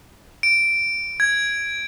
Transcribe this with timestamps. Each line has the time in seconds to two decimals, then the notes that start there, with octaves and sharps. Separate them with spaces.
0.43 D7
1.20 G#6